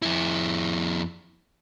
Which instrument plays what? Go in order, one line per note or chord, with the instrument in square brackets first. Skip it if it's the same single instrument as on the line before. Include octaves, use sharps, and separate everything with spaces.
[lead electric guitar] F2 E4